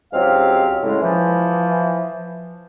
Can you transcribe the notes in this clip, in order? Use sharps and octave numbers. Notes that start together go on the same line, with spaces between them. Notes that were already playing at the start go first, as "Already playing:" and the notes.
C#2 G#2 F#3 C4 G4 F5
A2 C#3 G#3
E3 F3